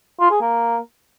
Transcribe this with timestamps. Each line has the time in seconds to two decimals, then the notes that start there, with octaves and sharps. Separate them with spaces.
0.20 F4
0.31 G#4
0.41 A#3